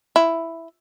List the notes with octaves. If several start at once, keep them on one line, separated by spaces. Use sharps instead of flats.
E4